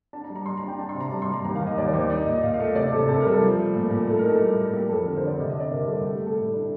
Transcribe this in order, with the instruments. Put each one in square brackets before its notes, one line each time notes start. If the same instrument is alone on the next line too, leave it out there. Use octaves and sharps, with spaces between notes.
[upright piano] D4 A5
A#5
G3
A#5
G3 C6
A#5
D4
G5
D4 A5
C6
C3
A#5
G3 A5
C6
G3
A#5
D#2 A#5
F5
D#2
D#5
D#2 D5
D5
D#2 C5
D#4 D5
A#2 D#5
A#2 F5
F5
A3
D#5
C3 D5
C3 A4
C3 A4
A#4
G3
A4
F3
A3
A#2
A#2
A2 A4
A#4
D#4
A4
G3
A2
A#3 G4
F2 A4
D3 A#4
C5
D3 D5
C3 D#5
D#5
D4 D5
C3 A#4
G3 A4
A3 G4
A3 G4
A4
A2
D4